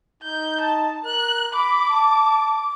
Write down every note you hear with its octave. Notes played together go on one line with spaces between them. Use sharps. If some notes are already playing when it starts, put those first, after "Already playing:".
D#4 G6
A5
A#4 F#6
B5 D6
A5